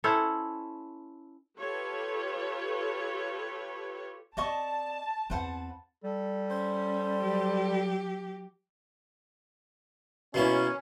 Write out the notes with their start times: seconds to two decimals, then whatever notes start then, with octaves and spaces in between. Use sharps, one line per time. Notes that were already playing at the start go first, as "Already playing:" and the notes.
0.04 C#4 E4 A4 C5
1.57 F4 G4 A4 B4 C#5
4.37 C4 D5 D#5 A5 C#6
5.30 E2 C4 B4 C5 F#5
6.04 G3 A4
6.51 C#4 C5
7.19 F#3 G4
10.34 B2 A#3 C#4 E4